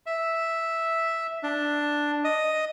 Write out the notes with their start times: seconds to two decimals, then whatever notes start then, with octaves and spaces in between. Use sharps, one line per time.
0.06 E5
1.43 D4
2.24 D#5